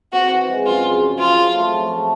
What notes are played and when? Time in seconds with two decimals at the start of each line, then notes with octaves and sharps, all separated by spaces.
0.13 C4 F#4
0.31 E3
0.49 G#3
0.66 F#2 F4
0.84 C#3
1.02 F3
1.19 C4 F4
1.37 F3
1.55 A3
1.73 F#3
1.91 A3